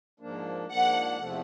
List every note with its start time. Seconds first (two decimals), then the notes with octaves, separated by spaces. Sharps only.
0.20 G#2 F3 A#3 D4
0.68 G#2 F3 A#3 D4 F#5
1.17 E2 C3 F3 A3